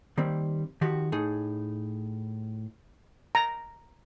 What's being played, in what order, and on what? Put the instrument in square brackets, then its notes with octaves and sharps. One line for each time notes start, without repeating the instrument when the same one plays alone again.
[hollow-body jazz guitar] D#3 G3 A#3 C4
D#3 F3 F#4 G4
A2 D#4 G#4
[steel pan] A#5